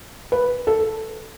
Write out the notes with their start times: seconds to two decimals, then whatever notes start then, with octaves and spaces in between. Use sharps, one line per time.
0.32 B4
0.67 A4